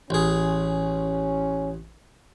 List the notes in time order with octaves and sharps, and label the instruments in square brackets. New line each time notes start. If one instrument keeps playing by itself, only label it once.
[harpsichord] A1 G#4 [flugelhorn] C#4